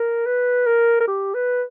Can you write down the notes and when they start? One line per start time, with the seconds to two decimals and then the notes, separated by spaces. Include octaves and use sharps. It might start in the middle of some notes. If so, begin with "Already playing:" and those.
Already playing: A#4
0.26 B4
0.66 A#4
1.00 A#4
1.07 G4
1.34 B4